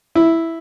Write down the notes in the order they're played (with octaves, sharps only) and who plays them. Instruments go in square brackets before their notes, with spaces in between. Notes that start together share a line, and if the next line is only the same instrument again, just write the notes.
[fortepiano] E4